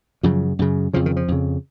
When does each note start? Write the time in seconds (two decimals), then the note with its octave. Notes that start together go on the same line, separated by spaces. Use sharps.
0.23 F#2 C#3 F3
0.59 F#2 C#3
0.93 F2 C#3 F3
1.06 D#3
1.17 F3
1.28 F2 C#3